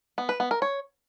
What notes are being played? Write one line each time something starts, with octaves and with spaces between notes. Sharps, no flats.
B3
B4
B3
A#4
C#5